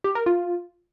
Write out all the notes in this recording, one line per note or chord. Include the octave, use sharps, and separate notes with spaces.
G4
A#4
F4